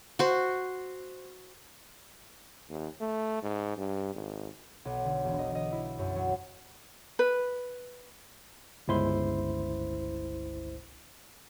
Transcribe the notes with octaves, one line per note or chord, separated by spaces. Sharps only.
F#4 C5
D#2
A3
G#2
G2
G#1
B1
D3
E1
D#5
D#5
E4
F#2
F#3
B4
G1 C#2 E4 C5 C6